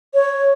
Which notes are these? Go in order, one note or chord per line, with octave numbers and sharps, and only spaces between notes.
C#5